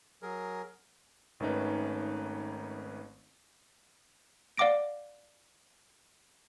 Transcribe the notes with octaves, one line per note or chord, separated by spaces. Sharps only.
F#3 G#4 A#4
G#1 D#3 A3 C#4 D#4 B4
D5 F5 F#5 D6 A#6 D7